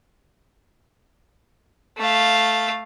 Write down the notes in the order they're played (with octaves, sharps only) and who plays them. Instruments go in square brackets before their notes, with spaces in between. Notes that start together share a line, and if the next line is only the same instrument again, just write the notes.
[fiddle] A3 F5